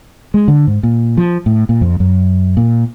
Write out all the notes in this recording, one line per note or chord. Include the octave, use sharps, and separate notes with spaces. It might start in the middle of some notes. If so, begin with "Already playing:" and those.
G#3
D3
G#2
A#2
F3
A2
A#2
F2
F#2
A#2